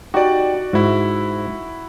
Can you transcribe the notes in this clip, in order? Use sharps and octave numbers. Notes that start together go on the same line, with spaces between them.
D#4 F#4 G4 D5
G#2 E4 F#4